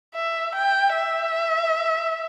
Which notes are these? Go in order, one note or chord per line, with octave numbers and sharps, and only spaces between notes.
E5
G5
E5